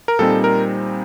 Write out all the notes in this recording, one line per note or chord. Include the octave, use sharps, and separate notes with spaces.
A#4
A#2 G3 C4 D#4 A4
A#4